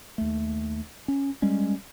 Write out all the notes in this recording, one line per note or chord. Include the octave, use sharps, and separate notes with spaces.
D#2 A3
C#4
G3 G#3 C#4